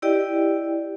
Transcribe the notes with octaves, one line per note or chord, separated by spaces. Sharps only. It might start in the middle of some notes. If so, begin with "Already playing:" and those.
E4 G4 D5 D#5 G5